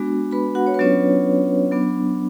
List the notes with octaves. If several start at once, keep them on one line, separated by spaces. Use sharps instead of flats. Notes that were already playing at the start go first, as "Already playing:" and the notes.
Already playing: G#3 B3 D4 F#4
B4 B5
F#4 F#5
C#5
B4
F#3 B3 C#4 D4 F4 C#5
F#3 B3 D4